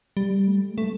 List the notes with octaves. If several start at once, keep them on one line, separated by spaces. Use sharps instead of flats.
G3
A3
A3